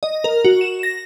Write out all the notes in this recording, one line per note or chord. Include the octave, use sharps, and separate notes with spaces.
D#5
A#4
F#4
E7
A#6